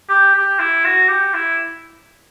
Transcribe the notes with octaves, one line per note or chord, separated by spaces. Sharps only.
G4
G4
E4
F#4
G4
E4